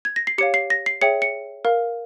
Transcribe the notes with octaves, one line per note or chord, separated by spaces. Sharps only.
G#6
A#6
C7
G4 C#5 F5 C#7
C7
A#6
C7
G#4 C#5 E5 G5 C#7
C#7
A#4 F5